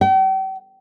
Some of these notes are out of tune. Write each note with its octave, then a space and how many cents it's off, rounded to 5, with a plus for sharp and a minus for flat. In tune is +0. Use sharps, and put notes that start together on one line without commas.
G5 -40